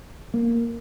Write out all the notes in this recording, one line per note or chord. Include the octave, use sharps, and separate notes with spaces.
A#3